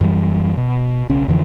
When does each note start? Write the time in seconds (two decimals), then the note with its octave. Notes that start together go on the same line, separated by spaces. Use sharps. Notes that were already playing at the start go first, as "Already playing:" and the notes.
0.01 F#2 E3 G3
0.57 B2
1.10 B1 C#3 C#4
1.28 F2 D3 E3 F3